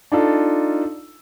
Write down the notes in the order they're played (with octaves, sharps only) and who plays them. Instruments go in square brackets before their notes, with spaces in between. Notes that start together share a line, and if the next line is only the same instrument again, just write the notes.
[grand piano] D4 D#4 F4 A4